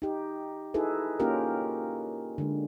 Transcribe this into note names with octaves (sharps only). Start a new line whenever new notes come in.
D#4 G4
D#4 E4 F#4 G#4 A4 B4
A#3 C#4 D#4 F4 G4 A#4
D3 G#3